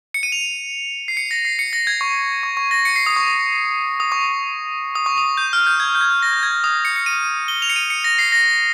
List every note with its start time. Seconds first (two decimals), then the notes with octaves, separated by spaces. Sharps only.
0.14 C#7
0.23 D#7
0.32 F7
1.08 C7
1.17 C#7
1.31 A#6
1.45 C7
1.59 C#7
1.73 A#6
1.87 G#6
2.01 C#6
2.43 C#6
2.57 C#6
2.71 A#6
2.85 C#7
2.96 C7
3.06 D#6
3.16 C#6
4.00 D#6
4.12 C#6
4.95 D#6
5.06 C#6
5.18 D#6
5.37 G6
5.53 F6
5.67 G6
5.80 G#6
5.95 G6
6.01 G#6
6.22 A#6
6.33 G6
6.43 G#6
6.64 D#6
6.85 C#7
6.96 C#7
7.06 D#7
7.48 G7
7.62 F7
7.70 C#7
7.76 D#7
7.90 C#7
8.04 A#6
8.19 C7
8.32 A#6